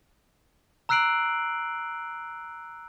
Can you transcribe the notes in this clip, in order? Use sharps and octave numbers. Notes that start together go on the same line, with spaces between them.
A#5 E6 F#6 C7 D7 F#7